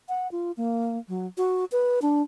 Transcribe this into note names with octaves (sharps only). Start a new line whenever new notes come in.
F#5
F4
A#3
F#3
F#4
B4
D4